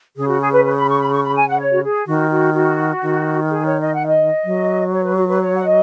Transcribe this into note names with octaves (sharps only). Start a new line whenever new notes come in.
C#3 G#4
F#4
G#4
B4
B4
B5
C#6
B5
C#6
B5
G#5
F#5
C#5
F#4
G#4
D#3 F#4
F#4
F#4
D#3
G#4
C#5
D#5
F#5
D#5
F#3
C#5
B4
F#4
B4
C#5
F#5
D#5